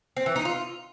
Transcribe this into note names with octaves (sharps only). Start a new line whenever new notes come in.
C4
E3
D#4
F4